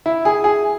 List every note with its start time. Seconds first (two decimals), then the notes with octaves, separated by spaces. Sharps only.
0.06 E4
0.25 G#4
0.44 G#4